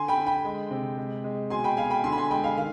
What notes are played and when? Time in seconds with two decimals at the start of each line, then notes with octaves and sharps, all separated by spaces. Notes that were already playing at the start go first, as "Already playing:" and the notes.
Already playing: D3 G#5 C6
0.08 G5 B5
0.18 D3
0.26 G5 B5
0.45 G#3
0.71 C3
0.98 G#3
1.24 G#3
1.50 B2 G#5 C6
1.64 G5 B5
1.77 B2 F5 G#5
1.90 G5 B5
2.04 D3 G#5 C6
2.12 B5
2.17 G#5 C6
2.31 G#3 G5 B5
2.44 F5 G#5
2.57 D#3 F5